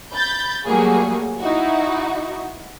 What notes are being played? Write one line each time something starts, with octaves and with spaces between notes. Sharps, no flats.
B5 G6 A6
F#3 G3 A3 A#3 F#4 G#4
D#4 E4 F#4